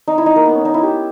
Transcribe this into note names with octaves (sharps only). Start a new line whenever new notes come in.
D#4
E4
D#4
A#3
B3
C#4
D#4
E4
G4